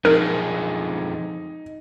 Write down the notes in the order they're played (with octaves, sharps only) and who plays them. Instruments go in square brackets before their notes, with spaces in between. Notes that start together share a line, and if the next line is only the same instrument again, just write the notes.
[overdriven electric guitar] F2 G#3 [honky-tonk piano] D#4 [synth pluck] A#4